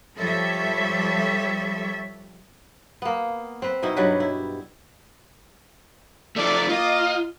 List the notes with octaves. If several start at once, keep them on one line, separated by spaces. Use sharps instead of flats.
F3 G3 A4 C#5 E5
A#3 B3
C4 B4
B2 D#4 E4
G2 F#3 G3 B4
E4
F3 A3 D5
A#3 F4 D#5